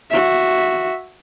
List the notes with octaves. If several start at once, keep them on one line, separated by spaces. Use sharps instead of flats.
F#4 E5